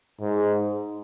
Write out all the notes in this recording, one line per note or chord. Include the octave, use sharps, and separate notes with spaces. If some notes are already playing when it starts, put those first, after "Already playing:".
G#2